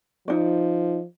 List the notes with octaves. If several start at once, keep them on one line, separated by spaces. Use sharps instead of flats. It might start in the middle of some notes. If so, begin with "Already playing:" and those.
F3 D#4 D5